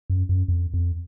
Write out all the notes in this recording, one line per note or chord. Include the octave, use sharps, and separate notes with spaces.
F#2
F#2
F2
F2